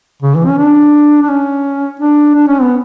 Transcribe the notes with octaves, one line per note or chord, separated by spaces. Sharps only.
C#3
E3
C#4
D4
D4
C#4
D4
D4
C#4
B3